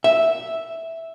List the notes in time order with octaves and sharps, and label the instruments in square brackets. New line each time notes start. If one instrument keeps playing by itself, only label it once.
[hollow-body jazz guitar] E5